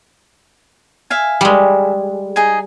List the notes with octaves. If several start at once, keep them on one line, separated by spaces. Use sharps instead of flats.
E5 F5 G#5
G3 G#3
D#4 G#4 G#5